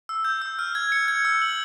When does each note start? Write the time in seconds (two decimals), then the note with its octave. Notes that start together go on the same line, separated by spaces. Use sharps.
0.09 E6
0.25 G6
0.42 E6
0.59 F6
0.75 G#6
0.92 C#7
1.08 G#6
1.25 E6
1.42 F#7